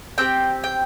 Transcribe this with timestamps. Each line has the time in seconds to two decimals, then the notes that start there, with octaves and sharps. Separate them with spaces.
0.18 C4 G4 G5
0.64 G5